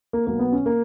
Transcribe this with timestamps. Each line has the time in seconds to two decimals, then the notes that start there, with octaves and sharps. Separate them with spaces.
0.13 A#3
0.27 B1 B2 F#3 A#3
0.39 B3
0.52 C#4
0.66 A#3